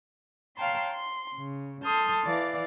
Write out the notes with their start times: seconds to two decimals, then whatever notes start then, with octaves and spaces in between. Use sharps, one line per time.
0.57 C#5 F5 G5 A5 A#5 C6
0.92 C6
1.34 C#3
1.84 A4 A5 C6 D#6 F6 G6
2.25 E3 D5 F5 A6